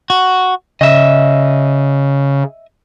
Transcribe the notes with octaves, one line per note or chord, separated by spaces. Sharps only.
F#4
C#3 D#5 E5